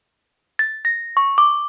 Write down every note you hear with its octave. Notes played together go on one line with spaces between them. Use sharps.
A6
A#6
C#6
D6